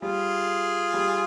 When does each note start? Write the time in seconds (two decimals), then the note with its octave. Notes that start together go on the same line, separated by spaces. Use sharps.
0.02 G3 F4 G#4
0.94 G3